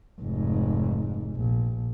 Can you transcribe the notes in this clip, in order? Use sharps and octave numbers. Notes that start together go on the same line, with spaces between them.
F1 G#2
A#1